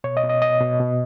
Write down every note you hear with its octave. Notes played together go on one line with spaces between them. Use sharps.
B2 C#5
D#5
B2
D#5
B2 D#5
B2
B2